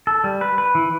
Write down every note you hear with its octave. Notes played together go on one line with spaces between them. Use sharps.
A4
G3
B4
B4
E3